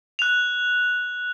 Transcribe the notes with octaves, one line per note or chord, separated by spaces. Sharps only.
F#6 F7